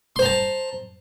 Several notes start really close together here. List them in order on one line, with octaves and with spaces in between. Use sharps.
C6 C5 A#5 A5